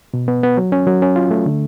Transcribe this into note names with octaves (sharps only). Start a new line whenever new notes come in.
B2
B3
B3
F#3
C#4
F#3
C#4
F4
A3
D3